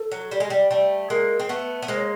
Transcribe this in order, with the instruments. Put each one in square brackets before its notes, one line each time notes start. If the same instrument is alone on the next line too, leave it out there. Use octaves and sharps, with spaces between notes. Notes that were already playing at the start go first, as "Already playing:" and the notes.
Already playing: [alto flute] A4
[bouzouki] F#3
G3
G#3
G3
G3 A3
[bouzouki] G#3 A#3 [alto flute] A#4
[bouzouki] C4
[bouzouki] A3 B3 [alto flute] B4
[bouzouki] B3
[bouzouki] G#3 A#3 [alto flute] C5
[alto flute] C#5